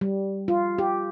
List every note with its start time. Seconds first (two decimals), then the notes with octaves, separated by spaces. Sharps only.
0.01 G3
0.48 F4
0.78 G4